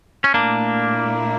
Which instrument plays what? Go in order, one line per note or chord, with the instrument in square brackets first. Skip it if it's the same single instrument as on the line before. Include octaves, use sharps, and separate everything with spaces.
[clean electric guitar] C#4
[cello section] A#2 A3 E4 [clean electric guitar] A#3 D4